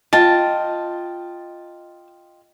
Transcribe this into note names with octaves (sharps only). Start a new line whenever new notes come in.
F4 D#5 G5 A5